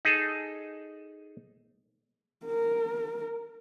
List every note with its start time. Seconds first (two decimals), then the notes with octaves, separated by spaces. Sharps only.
0.05 D#4 G#4 A4
2.46 A#4